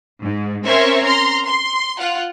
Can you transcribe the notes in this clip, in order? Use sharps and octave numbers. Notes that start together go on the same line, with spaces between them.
G#2
C4 C#4 A#4 C5 E5 C#6
A#5 C6 F6
C6
F4 F#5